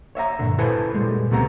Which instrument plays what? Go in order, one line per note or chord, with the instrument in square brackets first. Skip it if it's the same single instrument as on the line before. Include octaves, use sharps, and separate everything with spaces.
[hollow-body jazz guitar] C#5 E5 F5 A#5
G2 A#2 D3
E4 F#4 A4 B4 C5 G#5
A#2 G3 G#3
C#2 C3 G3 A3 B3 A#5